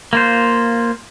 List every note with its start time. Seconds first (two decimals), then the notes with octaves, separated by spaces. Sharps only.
0.13 A#3 F4 C5